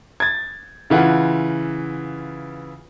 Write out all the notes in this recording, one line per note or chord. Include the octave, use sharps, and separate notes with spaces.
G#6 A6
C#3 E3 F4 F#5